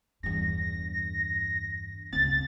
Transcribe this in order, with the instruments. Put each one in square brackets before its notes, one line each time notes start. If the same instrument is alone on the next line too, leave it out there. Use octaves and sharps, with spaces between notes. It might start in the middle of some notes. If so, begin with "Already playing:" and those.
[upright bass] E2 G2 [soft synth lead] A#6
[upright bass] C#2 C4 [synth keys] A6